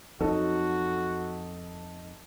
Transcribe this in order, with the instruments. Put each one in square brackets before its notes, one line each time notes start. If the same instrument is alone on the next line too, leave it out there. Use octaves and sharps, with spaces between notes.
[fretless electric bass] F2 F#3 [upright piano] D#4 A4 [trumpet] F#4